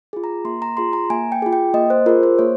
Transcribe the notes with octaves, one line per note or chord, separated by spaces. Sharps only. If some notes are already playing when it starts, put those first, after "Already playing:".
F4 G#4
A#5
A#3 C6
A#5
F4 G#4 C6
A#5
A#3 G#5
G5
F4 G#4
G5
A#3 D#5
C5
F4 G#4 A#4
C5
A#3 C#5